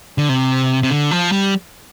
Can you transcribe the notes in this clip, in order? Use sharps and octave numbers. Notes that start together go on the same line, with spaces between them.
D3
C3
C3
D3
F3
G3